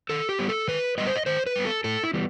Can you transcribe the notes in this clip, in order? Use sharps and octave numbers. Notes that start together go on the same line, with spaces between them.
D#3 A4
G4
G3 B3
A4
D#3 B4
G3 B3 D#5
C5
D#5
D#3 C5
B4
G3 B3
A4
A2 A4
E4
E3 G3 B3